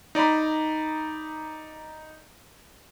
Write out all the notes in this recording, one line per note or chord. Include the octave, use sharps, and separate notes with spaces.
D#4 D5 A#5 B5